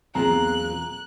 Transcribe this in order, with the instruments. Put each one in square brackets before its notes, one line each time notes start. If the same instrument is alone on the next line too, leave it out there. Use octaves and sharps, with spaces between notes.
[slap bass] B1 E2 A#3 [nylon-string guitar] C4 F4 G#4 [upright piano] A#5 [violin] F#6